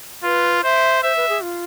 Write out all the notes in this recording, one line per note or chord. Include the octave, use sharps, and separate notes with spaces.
F4 B4
C5 E5
C5 E5
B4
G#4
F4